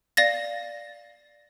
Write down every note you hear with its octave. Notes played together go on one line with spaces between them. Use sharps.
D5 F5 A6 A#6